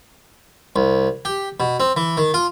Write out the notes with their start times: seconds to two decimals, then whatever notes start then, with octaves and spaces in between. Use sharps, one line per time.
0.76 C2
1.25 G4
1.60 B2
1.80 C4
1.97 E3
2.17 D#3
2.34 F4